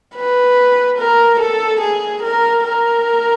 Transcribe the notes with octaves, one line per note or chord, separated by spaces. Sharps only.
B4
A#4
A4
G#4
A#4
A#4